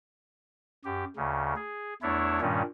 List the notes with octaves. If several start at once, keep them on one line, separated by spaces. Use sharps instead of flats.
F#2 G4
D2 C#3
G#4
E2 A3 D4 E4 C#5
G2 A#2 D#3 G3 C#4